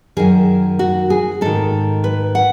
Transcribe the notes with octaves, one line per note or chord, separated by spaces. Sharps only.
F#2 D#3 G#4
F#4
G#4
G#2 D#3 A4
B4
F#5